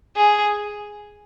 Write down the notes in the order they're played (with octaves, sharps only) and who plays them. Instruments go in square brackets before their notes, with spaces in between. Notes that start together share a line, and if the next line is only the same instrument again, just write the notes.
[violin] G#4